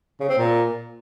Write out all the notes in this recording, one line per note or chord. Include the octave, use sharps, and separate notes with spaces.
C#3
C4
A#2